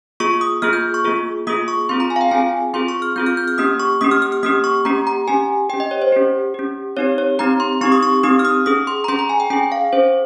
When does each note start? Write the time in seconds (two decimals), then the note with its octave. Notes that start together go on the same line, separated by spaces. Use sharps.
0.20 A#3 F4 G#4 C#6
0.41 D#6
0.62 A#3 F4 G#4 F6
0.73 G6
0.94 C#6
1.04 A#3 F4 G#4
1.47 A#3 F4 G#4 D#6
1.68 C#6
1.89 C4 F4 G#4 C6
2.00 A#5
2.10 G#5
2.16 F5
2.21 G5
2.31 C4 F4 G#4 G#5
2.73 C4 F4 G#4 C6
2.88 C#6
3.02 F6
3.16 C4 F4 G#4 G6
3.26 F6
3.37 G6
3.48 F6
3.58 A#3 C#4 G4 D#6
3.80 C#6
4.01 A#3 C#4 G4 D#6
4.11 F6
4.22 F6
4.32 F6
4.43 A#3 C#4 G4 D#6
4.64 C#6
4.85 A#3 C#4 G4 A#5
5.07 A#5
5.28 C#4 G4 G#5
5.69 G4 G5
5.73 C#4
5.80 D#5
5.91 C#5
6.02 C5
6.12 C#4 G4
6.54 C#4 G4
6.97 C4 D#4 G4 C#5
7.18 C#5
7.39 C4 D#4 G4 A#5
7.60 C6
7.81 C4 D#4 G4 C#6
7.92 D#6
8.03 C#6
8.23 C4 D#4 G4 D#6
8.39 F6
8.45 D#6
8.66 C#4 G#4 D#6
8.87 C6
9.04 A#5
9.08 C#4 G#4 C6
9.19 A#5
9.29 G#5
9.40 G5
9.50 C#4 G#4 G5
9.72 F5
9.93 C#4 G#4 C5